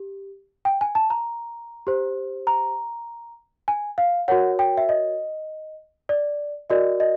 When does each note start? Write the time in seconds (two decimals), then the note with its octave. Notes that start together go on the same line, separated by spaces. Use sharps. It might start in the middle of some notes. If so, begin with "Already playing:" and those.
Already playing: G4
0.65 G5
0.81 G#5
0.95 A5
1.10 A#5
1.87 G4 C5
2.47 A#5
3.68 G#5
3.98 F5
4.28 F#4 A#4 C#5 F#5
4.59 G5
4.77 E5
4.89 D#5
6.09 D5
6.70 F#4 A#4 D5 D#5
7.00 D#5